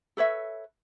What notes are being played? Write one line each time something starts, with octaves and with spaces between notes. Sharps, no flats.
A4 B4 C#5 E5